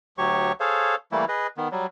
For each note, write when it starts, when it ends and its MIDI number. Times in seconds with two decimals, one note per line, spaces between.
0.18 0.52 38
0.18 0.52 54
0.18 0.52 67
0.18 0.52 73
0.18 0.52 85
0.60 0.95 68
0.60 0.95 69
0.60 0.95 72
0.60 0.95 73
0.60 0.95 77
1.12 1.25 52
1.12 1.25 55
1.12 1.25 57
1.12 1.25 58
1.12 1.25 64
1.28 1.47 68
1.28 1.47 71
1.28 1.47 75
1.57 1.68 51
1.57 1.68 59
1.72 1.86 54
1.72 1.86 55